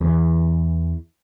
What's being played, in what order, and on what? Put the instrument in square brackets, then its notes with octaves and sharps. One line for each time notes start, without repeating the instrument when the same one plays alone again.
[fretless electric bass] E2 E3